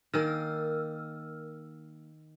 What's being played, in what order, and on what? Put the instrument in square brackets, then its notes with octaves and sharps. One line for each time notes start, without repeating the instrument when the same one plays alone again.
[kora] D#3 A#3 [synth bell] A#4 E6 F6